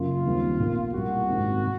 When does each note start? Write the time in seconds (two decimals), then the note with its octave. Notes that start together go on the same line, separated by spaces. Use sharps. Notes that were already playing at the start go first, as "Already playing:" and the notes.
Already playing: F#2 C#3 F#3 A#3 F4
0.25 D#2 D#3 G3 C4
0.59 B1 A#2 F3 A#3
0.93 C2 A#2 G3 A#3 F#4
1.28 G#1 F#2 D#3 G#3 C4
1.63 C3